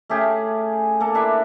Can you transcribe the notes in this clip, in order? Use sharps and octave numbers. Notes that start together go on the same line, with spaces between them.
A3 C#4 G4 G#4
A#3 A4
D4 E4 A#4 E5